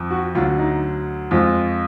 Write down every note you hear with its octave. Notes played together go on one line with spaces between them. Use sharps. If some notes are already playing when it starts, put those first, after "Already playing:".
Already playing: F2 F3
F#4
D2 D3 F#3 F4
D#4
F2 F3 G#3 F4